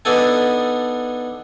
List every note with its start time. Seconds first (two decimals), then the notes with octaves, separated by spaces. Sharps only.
0.05 B3 D4 D#4 A4 G#5